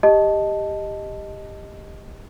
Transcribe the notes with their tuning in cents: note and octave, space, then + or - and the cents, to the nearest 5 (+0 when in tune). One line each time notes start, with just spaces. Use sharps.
G4 +15 D#5 +0 A5 -5